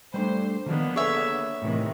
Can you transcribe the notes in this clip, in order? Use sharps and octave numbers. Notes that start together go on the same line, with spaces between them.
G3 A3 D4 C5
D3 D#3 F3 A#3 B3
G#4 A4 B4 C#5 E5
A2 C3 D#3 E3